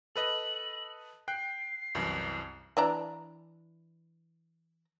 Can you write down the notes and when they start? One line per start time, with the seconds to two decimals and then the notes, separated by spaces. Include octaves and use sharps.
0.16 A4 B4 D#5 F#7
1.28 G5 F#6 C7
1.95 C2 F#2 E3
2.77 E3 D4 A#5